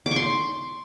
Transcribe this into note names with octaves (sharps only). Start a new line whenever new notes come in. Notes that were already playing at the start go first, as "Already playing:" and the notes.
D6
C#6
C6